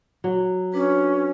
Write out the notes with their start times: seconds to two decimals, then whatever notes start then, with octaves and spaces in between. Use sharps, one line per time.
0.24 F#3
0.74 C#4 D4 F#4 B4